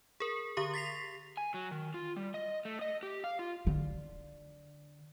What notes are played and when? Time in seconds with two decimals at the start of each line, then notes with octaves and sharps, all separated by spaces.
0.20 G#4 A#4
0.57 D3 G4 C#6
0.74 A6 B6 C7 F7
1.37 G#5
1.54 F#3
1.71 D#3
1.94 F4
2.16 G3
2.34 D#5
2.65 A3
2.81 D#5
3.03 G4
3.24 F5
3.39 F4
3.67 D3